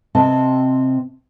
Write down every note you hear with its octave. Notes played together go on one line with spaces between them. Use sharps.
C3 C4 D#5 A5